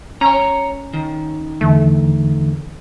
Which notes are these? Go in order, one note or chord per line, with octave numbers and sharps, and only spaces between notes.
C#4 C#5 A#5
D#3
E2 D3 E3 A3